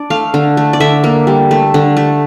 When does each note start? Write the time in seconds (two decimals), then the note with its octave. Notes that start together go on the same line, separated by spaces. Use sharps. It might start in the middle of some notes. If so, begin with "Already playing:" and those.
Already playing: D4 D5
0.10 A3 F5
0.34 D3
0.57 A3
0.73 D5
0.80 D3 E5
1.04 A#3
1.27 G3
1.51 A3
1.74 D3
1.97 A3